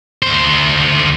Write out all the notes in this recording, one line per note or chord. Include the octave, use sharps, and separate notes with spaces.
D2 C5